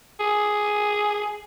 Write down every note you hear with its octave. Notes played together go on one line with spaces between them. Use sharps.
G#4